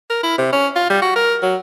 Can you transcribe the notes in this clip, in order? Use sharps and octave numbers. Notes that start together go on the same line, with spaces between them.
A#4
E4
C3
C#4
F4
G3
F#4
A#4
F#3